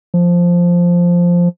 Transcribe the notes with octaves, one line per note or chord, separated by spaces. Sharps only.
F3